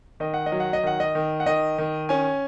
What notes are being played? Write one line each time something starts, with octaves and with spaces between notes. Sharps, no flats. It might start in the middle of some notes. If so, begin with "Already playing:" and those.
D#3 D#5
F#5
D#5
F#3
F#5
D#5
D#3 F#5
D#5
D#3
F#5
D#3 D#5
D#3
C#4 G#5